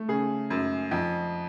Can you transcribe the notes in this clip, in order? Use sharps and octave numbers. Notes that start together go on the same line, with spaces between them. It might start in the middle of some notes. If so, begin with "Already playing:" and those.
Already playing: A3
C#3 G#4
F#2
F2